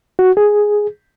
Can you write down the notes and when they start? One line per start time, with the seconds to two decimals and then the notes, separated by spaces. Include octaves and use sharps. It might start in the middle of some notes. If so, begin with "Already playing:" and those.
0.19 F#4
0.37 G#4